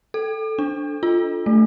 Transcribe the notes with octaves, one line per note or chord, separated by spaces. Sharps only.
A4
D4
F4
A3